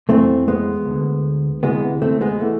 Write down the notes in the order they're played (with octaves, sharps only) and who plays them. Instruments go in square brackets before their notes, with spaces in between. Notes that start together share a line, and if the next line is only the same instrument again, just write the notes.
[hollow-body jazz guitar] F2 E3 A3 C4
G#3 B3
D2
D3
D2 C3 E3 G#3 B3
A3 C4
G#3 B3
E3 A3